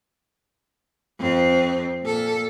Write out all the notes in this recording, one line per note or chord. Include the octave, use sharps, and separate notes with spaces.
F2 C4
A#2 A4